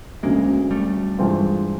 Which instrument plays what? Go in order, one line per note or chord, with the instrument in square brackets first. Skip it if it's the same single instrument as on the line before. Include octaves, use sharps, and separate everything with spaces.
[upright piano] D2 C#3 F#3 [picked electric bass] G#3 A#3
[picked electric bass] G3 A3
[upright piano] G2 E3 G#3 C4 F4